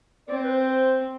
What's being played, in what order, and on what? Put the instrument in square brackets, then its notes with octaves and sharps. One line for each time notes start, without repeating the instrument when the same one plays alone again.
[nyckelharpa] C4 [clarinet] D5
[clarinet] C5
B4
C5